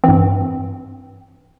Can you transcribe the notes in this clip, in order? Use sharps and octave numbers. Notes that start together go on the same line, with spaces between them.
G2 E3 C4